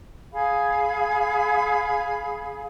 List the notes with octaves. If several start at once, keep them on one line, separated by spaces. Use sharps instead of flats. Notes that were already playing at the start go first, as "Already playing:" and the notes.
G#4 F5 G#5 B5